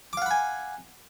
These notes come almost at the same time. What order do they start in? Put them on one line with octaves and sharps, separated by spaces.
D6 F5 F#5 B5 G#5